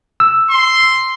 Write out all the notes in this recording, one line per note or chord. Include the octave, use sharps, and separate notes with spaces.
E6
C6